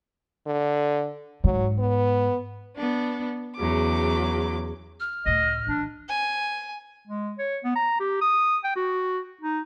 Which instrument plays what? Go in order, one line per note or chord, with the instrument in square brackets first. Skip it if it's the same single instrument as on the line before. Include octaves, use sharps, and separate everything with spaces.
[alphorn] D3
[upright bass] G#2 [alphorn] F#3
[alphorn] B3
[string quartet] B3 D4
E2 C#3 F#3 D6
[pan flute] F6
[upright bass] C#2 A2 [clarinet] D#5
[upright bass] A#1 E3 [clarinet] D4
[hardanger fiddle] G#5
[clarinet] G#3
C#5
B3
A#5
G4
D#6
G5
F#4
D#4